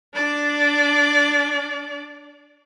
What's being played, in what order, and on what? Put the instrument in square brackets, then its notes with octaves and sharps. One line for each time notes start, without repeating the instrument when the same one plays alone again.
[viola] D4 D5